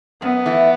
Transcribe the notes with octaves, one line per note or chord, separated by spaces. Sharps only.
F#2 B3
E3 A3 E4